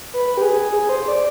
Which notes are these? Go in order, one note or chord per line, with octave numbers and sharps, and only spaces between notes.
B4
G4
G#4
G#4
C5
D5